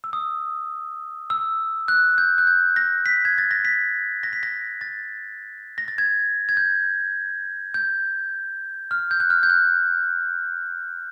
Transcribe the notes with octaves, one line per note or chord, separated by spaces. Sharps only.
E6
D#6
E6
F#6
G6
F#6
G6
A#6
B6
G#6
A6
A#6
B6
A#6
B6
A#6
A6
A#6
A6
G#6
G#6
G6
G6
F6
G6
F#6
F6
G6
F#6